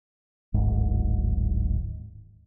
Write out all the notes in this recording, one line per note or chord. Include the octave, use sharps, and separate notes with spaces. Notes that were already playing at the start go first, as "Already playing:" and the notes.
D1 G#1 G#2